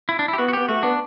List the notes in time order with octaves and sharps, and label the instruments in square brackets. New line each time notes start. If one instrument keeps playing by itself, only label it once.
[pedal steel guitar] E4
D4
E4
G4
[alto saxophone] B3 [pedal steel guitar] F#4
[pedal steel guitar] F#4
[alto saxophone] B3 [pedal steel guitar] G4
[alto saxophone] A3 [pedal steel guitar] F#4
[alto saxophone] B3 [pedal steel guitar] D4